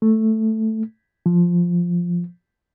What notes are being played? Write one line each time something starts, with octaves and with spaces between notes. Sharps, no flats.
A3
F3